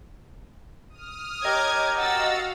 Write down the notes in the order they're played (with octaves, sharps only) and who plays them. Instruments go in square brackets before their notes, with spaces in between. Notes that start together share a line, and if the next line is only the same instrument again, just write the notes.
[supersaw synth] D#6 F6
[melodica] G4 A#4 [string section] C#5 D6 G#6 [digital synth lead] D#5
[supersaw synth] F#4 F5 [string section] F#5 E6 A6